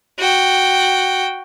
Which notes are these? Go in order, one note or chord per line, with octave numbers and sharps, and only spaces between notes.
F#4 G5